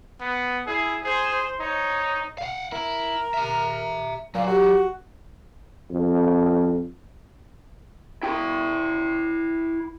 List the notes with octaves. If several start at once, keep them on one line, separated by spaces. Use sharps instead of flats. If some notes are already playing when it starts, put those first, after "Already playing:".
B3
E4 G#4
G#4 C5
D#4 C#5
F5 F#5
E4 A#4
E5 A#5
A#2 F#3 F5
F#4 G4
F2
E4 G5